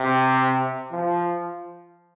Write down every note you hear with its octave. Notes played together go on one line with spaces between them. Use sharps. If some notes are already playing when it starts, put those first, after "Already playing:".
Already playing: C3
F3